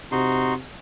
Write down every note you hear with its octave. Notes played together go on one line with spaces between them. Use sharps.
C3 D#4 F#4 C6